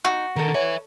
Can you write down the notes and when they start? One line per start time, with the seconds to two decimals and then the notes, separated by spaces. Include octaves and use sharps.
0.05 D#4 F#4
0.36 D3 D#3 A4 A#4
0.54 B4 C#5 E5